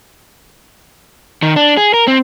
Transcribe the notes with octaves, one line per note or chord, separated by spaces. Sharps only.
D#3
D4
G#4
A#4
C4